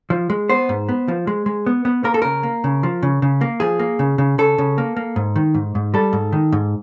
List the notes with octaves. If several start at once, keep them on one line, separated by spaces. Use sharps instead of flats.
F3
G#3
B3 C5
G#2
B3
F3
G#3
G#3
B3
B3
A#3 A#4
A4
C#3 A#4
A#3
C#3
F3
C#3
C#3
A#3
F3 G#4
A#3
C#3
C#3
C#3 A4
C#3
A#3
A#3
G#2
D#3
G#2
G#2
G3 A4
G#2
D#3
G#2